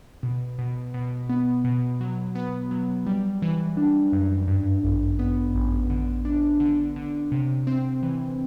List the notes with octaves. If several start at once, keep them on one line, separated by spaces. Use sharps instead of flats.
B2
B2
B2
B3
B2
F#3
B3
F#3
G3
E3
D4
F#2
G2
A1
B3
A1
D3
D4
D3
D3
C3
C4
E3